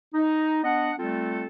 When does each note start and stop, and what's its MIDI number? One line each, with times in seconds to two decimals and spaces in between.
0.14 0.60 63
0.63 0.91 59
0.63 0.91 62
0.63 0.91 75
0.63 0.91 78
0.97 1.47 55
0.97 1.47 57
0.97 1.47 60
0.97 1.47 65
0.97 1.47 69